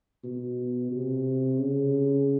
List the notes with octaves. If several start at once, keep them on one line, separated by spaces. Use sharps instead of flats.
B2
C3
C#3